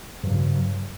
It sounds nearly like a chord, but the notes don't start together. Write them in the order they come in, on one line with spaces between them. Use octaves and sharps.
G2 F#3 C#3